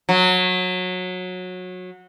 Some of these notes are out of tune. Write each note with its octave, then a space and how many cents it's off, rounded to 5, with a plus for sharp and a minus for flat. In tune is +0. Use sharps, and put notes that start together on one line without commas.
F#3 -20